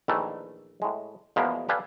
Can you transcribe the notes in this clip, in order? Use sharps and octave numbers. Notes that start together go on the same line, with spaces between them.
A#1 D#3 E3 A3
A2 G#3
E2 B2 F3 G#3 A#3 B3
G4 A4 B4 D5 F5 G#5